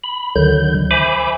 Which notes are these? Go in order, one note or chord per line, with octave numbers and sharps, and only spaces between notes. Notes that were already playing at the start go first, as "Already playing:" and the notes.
B5
D2 D3 D#3 F#3 G6
C5 E5 G#5 B5 D6